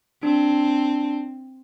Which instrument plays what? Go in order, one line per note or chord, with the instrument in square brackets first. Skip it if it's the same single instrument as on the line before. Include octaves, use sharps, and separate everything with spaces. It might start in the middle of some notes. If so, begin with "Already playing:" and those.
[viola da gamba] C4 [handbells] D4